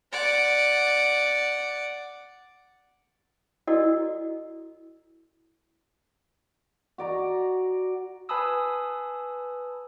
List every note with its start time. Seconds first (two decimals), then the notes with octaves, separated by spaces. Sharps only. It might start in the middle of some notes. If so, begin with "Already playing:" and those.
0.13 D5 F#5
3.67 E4 F#4 A4 D5 D#5 E6
6.98 F#4 D5 A#5
8.29 B4 G#5 A5 B5 D#6 E6